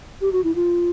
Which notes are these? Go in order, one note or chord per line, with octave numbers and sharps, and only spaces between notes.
G4
F#4
E4
F4